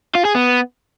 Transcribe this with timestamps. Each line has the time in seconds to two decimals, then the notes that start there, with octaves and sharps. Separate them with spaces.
0.15 F4
0.25 G#4
0.35 B3